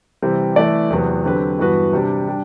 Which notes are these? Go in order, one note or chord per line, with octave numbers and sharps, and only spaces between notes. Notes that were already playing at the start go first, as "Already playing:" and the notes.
C3 E3 G3 C4
E3 A3 E4 A4 D5
E2 C3 F#3 B3
D3 F#3 C4 G4 B4
G2 E3 B3 F#4 B4
C3 G3 D4
G3 D4